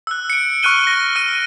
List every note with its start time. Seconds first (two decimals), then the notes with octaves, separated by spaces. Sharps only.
0.07 E6 F#6
0.30 C#7 D7
0.63 C#6 F6 F#6 D#7 G7
0.85 A#6 D#7
1.16 F6 D#7